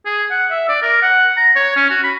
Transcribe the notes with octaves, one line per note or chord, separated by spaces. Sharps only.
G#4
F#5
E5
D5
A#4
F#5
A#5
C#5
C#4
F#4
B5